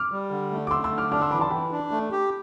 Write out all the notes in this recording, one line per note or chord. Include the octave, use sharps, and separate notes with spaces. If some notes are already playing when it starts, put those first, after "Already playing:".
Already playing: D6 F6
G3
D3
A3
D6
A3 C6 E6
C6 E6
D3
D6 F6
D4 D6 F6
C6 E6
E3 B5 D6
A5 C6
E3 G5 B5
D4
A3
G4